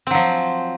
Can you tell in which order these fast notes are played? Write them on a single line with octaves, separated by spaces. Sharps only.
C4 F#3 F3